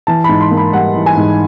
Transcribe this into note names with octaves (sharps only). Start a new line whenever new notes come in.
E3 A5
G#2 B5
C6
A#3
B5
G3 F#5
E3
G#5
G#2